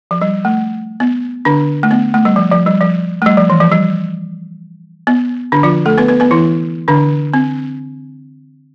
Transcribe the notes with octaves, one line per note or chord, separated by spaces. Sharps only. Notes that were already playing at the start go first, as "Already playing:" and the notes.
F3
G3
A3
B3
D3 D4
A3
B3
A3
G3
F3
F3
G3
F3
A3
G3
F3
E3
F3
G3
B3
D3 D4
F3 F4
A3 A4
B3 B4
B3 B4
B3 B4
E3 E4
D3 D4
C4